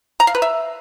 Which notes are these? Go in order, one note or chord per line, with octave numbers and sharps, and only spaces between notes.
A#5
F5
B4
E5